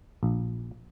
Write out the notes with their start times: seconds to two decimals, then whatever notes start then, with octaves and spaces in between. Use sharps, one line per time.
0.23 A#1